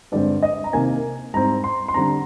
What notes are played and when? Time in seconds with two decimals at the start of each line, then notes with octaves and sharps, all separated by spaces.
0.12 G2 D3 G#3 C4 D5
0.42 D#5
0.64 A#5
0.73 C3 D#3 A#3 G#5
1.34 G#2 G3 C4 A#5
1.64 C6
1.88 C6
1.94 D3 G3 C4 A#5